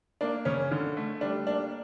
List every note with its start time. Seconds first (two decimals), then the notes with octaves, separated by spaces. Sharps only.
0.21 A#3 D4
0.45 C#3 C#4
0.71 D3
0.97 A3
1.21 G3 D4
1.47 A#3 D4